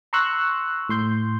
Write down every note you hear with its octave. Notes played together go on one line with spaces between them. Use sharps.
A#5 C6 C#6 E6 F#6
A2 C6 G6